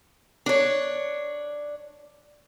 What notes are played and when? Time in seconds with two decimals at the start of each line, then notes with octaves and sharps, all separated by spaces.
0.46 D4 C#5